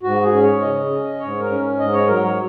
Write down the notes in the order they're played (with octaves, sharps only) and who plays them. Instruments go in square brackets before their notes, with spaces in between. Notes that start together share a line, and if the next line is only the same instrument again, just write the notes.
[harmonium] G#2 F#4
G#4
C#4
C#5
C#3 D#5
C#4
G#2 C#5
A#4
C#4
G#2 D#5
C#5
F#3 A#4
C#5